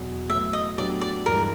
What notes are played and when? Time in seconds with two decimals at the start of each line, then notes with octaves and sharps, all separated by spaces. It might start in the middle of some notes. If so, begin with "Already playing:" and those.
Already playing: E2 B2 F#3
0.30 A2 F#3 B3 E5
0.53 D#5
0.78 A2 F#3 B3 D4 G4 D5
1.01 D5
1.26 G2 E3 G#3 A#4